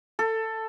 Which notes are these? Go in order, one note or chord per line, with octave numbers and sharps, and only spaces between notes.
A4